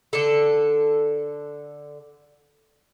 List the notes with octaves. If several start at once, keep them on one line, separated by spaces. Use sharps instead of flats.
D3 A4